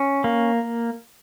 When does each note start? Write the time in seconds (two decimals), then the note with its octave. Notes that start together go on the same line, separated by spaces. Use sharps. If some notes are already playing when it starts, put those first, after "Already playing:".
Already playing: C#4
0.24 A#3